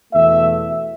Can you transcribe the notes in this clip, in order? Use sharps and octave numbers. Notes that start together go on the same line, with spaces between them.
E2 B2 A3 E5